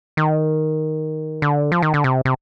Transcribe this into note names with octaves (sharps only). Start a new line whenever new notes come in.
D#3
D3
F3
D#3
D3
C3
C3